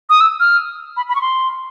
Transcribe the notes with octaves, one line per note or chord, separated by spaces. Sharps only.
D#6
E6
F6
B5
B5
C#6
C6